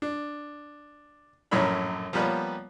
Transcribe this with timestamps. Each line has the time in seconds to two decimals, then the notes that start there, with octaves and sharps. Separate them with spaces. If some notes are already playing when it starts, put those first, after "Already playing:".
0.02 D4
1.51 A#1 F#2 A2 A#4 C#5 B5
2.13 F3 G3 A#3 B3 B4 C#5